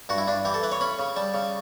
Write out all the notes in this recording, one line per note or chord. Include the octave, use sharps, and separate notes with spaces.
G2 F#4
E4
G2 D4
E3 G4
A4
E3 B4
C#5
C#4 B5
C#3
G3 A5
C#3